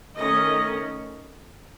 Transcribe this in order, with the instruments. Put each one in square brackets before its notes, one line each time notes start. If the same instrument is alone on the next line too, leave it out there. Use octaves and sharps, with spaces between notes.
[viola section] D#3 A3 C#4 D#5